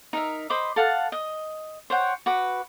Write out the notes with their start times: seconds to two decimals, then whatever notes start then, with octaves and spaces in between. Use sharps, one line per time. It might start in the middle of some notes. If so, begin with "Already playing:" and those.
0.13 D#4 A#4 E5
0.50 C5 D#5 B5 D6
0.76 A4 F5 F#5 A5
1.12 D#5
1.90 C5 C#5 F#5 G5
2.26 F#4 B4 D6